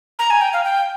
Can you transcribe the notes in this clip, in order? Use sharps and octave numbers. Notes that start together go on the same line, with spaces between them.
A#5
G#5
G5
F5
G5